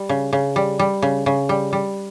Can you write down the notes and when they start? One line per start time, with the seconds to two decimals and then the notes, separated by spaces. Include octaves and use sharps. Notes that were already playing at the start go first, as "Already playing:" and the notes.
Already playing: G3
0.09 C#3
0.33 C#3
0.56 G3
0.79 G3
1.02 C#3
1.26 C#3
1.49 G3
1.73 G3